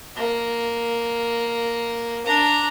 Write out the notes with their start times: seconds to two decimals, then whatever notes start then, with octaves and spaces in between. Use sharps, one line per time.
0.16 A#3
2.26 D4 A#5